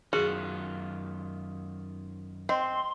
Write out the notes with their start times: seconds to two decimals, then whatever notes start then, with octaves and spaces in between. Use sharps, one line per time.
0.13 F#2 D#3 F4 F#4 G#4
2.49 C4 D#5 C6